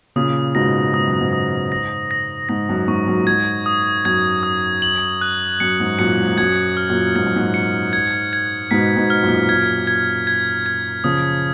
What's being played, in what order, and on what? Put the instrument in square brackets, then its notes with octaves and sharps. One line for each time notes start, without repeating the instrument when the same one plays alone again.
[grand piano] A#2 C#3 [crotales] D#6
[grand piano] G#2 B2 [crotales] A#6
[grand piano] G#2 [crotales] D#6
[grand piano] F#2
G#2
[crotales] D#6
A#6
A#6
[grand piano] G#2 [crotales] A#6
[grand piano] F#2
[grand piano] G#2 [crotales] C#6
[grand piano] F#2
A#2
[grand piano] G#2 [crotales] G#6
[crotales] D#6
[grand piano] F#2 [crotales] G#6
[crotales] D#6
F#7
F#6
[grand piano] F#2 [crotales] C#7
[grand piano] G#2
[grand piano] F#2 A#2 [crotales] C#7
[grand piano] G#2
[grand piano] F#2 [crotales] G#6
[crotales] F6
[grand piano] F#2 A#2
[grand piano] G#2 [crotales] G#6
[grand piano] F#2
G#2
[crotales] C#7
G#6
G#6
[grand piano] G#2 B2 [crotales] B6
[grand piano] G#2 B2
[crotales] F6
[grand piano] F#2 A#2
[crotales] G#6
G#6
G#6
G#6
[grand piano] C#3 F3 [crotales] D#6